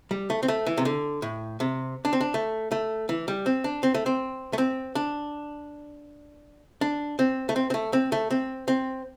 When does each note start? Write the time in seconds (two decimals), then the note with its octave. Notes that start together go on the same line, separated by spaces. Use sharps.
0.11 G3
0.30 A3
0.43 C4
0.48 A3
0.66 E3
0.78 C3
0.85 D3
1.22 A2
1.60 C3
2.05 D4
2.13 C4
2.21 D4
2.34 A3
2.72 A3
3.09 E3
3.28 G3
3.46 C4
3.64 D4
3.83 C4
3.94 A3
4.06 C4
4.53 A3
4.58 C4
4.95 D4
6.81 D4
7.19 C4
7.49 A3
7.56 C4
7.70 C4
7.74 A3
7.93 C4
8.12 A3
8.31 C4
8.68 C4